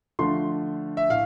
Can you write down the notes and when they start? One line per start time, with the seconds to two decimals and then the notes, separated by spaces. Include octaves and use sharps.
0.19 D3 F3 A3 C6
0.97 E5
1.10 A2 F5